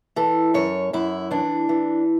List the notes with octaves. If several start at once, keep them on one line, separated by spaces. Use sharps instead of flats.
E3 A4
F#2 C#5
F#2 E4
E3 D4
E3